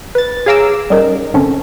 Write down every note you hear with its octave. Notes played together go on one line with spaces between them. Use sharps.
B4 A6
G#4 C#5 F5 A#5 D6 E6
G3 C#4 D#4 A#4
G1 C4 C#4 A4